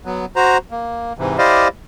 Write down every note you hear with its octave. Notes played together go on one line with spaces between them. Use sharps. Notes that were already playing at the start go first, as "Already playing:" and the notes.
F#3 B3
F#4 C5 A#5
A#3
G#2 C3 E3
E4 G4 C5 D5 D#5 F5